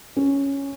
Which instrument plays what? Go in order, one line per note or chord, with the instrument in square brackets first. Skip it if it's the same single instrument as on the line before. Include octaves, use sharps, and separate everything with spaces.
[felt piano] C#4